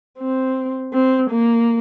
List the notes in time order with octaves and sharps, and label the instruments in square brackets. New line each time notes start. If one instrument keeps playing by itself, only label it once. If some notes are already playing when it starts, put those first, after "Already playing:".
[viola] C4
C4
A#3